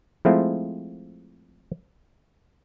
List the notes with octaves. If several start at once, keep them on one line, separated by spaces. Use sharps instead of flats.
F3 G#3 A3 C4 E4 F4